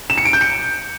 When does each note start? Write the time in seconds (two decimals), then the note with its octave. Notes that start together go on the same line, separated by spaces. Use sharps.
0.10 E7
0.18 C#7
0.25 D7
0.33 G6
0.41 C#7